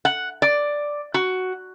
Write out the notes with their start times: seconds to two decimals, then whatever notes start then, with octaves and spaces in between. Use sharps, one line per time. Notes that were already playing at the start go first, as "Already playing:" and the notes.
0.05 F#5
0.42 D5
1.14 F#4